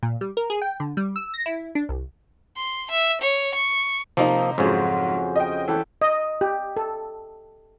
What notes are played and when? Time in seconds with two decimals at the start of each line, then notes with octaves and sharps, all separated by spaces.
0.03 A#2
0.21 G3
0.37 A#4
0.50 G#4
0.62 G5
0.80 D3
0.97 G3
1.16 E6
1.34 A#6
1.46 E4
1.75 D4
1.89 C2
2.56 C6
2.90 E5
3.21 C#5
3.54 C#6
4.17 C3 F3 A#3 D#4
4.58 F2 G#2 C#3 F#3 C#4 F#4 C5
5.36 D#5 G5
5.68 E3 A4 B4 G5
6.02 D#5
6.41 G4
6.77 A4